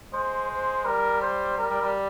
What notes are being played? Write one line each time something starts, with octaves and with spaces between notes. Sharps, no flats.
G#3 C5
C5
G3 A#4
C5
G3 A#4
G3
G3